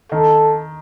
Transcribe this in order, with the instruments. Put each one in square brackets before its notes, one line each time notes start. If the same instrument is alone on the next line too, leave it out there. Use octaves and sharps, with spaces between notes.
[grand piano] D#3 [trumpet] A4